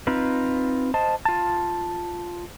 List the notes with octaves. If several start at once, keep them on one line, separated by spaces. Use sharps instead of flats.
C4 D#4 F4 B4
C5 D#5 A5
F4 A5